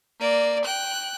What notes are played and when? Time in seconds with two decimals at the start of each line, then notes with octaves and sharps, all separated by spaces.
0.20 A#3 D5
0.64 G5 F#6